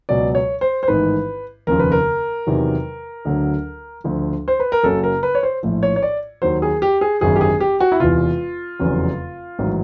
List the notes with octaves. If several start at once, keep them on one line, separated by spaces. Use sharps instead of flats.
C#2 B2 F#3 D5
C#5
C5
C5
A1 G#2 D#3 B4
F1 D#2 C#3 F3 A#4
B4
A#4
E2 C3 D#3 F#3
D2 D3 F#3
D2 D3 F3
C5
B4
A#4
F#1 F#2 C#3 F#3 A4
A#4
B4
C#5
C5
A#1 A2 F3
C#5
C#5
D5
D#2 D#3 F#3 C5
G#4
G4
G#4
G#1 F#2 D3 F#3 G#4
G4
G#4
G4
F#4
E4
E1 E2 C3 F4
F1 E2 C#3 F#3
A1 G#2 D#3 F#3